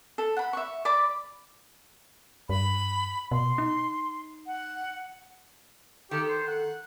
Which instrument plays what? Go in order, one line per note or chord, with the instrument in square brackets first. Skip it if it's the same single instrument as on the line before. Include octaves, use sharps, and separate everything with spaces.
[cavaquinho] A4
F#5 B5
E5 C#6
D5 B5 D6
[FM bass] G2 [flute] B5
[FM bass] B2 [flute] C6
[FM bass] D#4
[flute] F#5
[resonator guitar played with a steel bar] D#3 A4 [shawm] G4
[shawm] C5
F#5